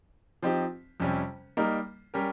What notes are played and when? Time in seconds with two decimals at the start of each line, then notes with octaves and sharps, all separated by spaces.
0.43 F3 C4 D#4 G4
1.00 F2 C3 G3 C#4
1.57 G3 A#3 D#4 A#4
2.14 G3 C#4 G4 A#4